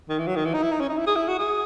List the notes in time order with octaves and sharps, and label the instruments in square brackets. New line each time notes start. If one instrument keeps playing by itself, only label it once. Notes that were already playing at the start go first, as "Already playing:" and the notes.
[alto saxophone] D#3
E3
F#3
D#3
E3
D#4
E4
D#4
C#4
D#4
E4
G#4
E4
F#4
G#4